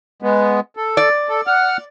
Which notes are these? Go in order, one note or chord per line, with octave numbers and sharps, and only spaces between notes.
G#3 B3
A4
D5
A4
F#5 F6